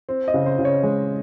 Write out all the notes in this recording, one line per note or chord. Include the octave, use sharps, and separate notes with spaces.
C4
D#5
C#3
C5
C#3
C#5
G#3